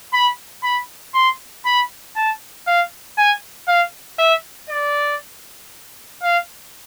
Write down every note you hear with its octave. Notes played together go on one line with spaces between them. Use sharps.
B5
B5
C6
B5
A5
F5
G#5
F5
E5
D5
F5